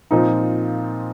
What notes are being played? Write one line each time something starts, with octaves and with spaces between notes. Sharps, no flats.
A#2 F3 C4 D#4